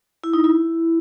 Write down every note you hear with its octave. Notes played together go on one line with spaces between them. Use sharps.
E4
D#4
E4